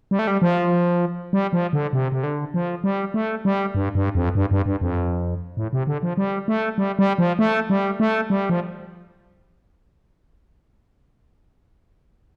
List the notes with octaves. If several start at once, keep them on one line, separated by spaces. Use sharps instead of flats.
G3
A3
G3
F3
G3
F3
D3
C3
C3
D3
F3
G3
A3
G3
G2
G2
F2
G2
G2
G2
F2
A2
C3
D3
F3
G3
A3
G3
G3
F3
A3
G3
A3
G3
F3